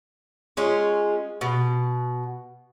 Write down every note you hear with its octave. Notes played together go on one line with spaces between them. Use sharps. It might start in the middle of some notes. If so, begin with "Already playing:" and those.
G#3 C#4 F4
B2